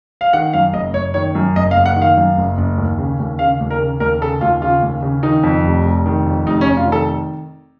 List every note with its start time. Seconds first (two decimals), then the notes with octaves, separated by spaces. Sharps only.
0.21 F5
0.33 D#3 F#5
0.53 F#2 F5
0.73 F#1 D#5
0.94 F#1 C#5
1.14 D#3 C#5
1.35 F#2
1.56 F#1 D#5
1.71 F5
1.77 F#1
1.86 F#5
1.96 D#3
2.02 F5
2.17 F#2
2.37 F#1
2.58 F#1
2.78 D#2
2.98 C#3
3.20 D#2
3.39 C#3 F5
3.61 D#2
3.71 A#4
3.81 C#3
4.00 D#2 A#4
4.22 C#3 A4
4.41 D#2 F4
4.62 C#3 F4
4.82 D#2
5.02 C#3
5.23 D#3 D#4
5.43 F2
5.65 F1
5.85 F1
6.06 D#3
6.26 F2
6.46 F1 D#4
6.61 C#4
6.67 F1
6.77 F4
6.87 D#3
6.92 A4